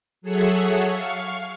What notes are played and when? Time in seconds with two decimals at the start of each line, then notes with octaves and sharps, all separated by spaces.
0.22 F#3 G#4 A4 C#5 E5 F#5
0.90 F5 C#6